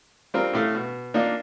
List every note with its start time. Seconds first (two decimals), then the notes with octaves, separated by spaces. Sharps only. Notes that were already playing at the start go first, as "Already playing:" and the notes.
0.34 G3 C4 F4 A#4
0.53 A2 A3 F5
0.75 B2
1.14 A#3 D4 D#4 F4